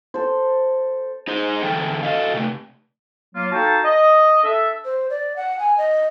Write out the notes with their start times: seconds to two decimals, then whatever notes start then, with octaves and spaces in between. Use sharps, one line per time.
0.14 A4 C5
1.27 D#4 G#4 C5
1.62 E2 D3 E3 A4 G5
2.03 A4 D#5 F5
2.34 C3 A3
3.36 F#3 A#3 F4
3.52 D#4 F#4 A4 F5 G5 A5
3.85 D#5
4.44 D4 A4 E5
4.85 C5
5.10 D5
5.36 F#5
5.59 G#5
5.78 D#5